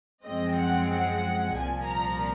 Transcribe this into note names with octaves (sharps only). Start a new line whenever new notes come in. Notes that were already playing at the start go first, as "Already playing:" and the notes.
F#2 F3 G#3 C4 D#5
F#5
F#5
C2 A#2 F3 G#5
A#5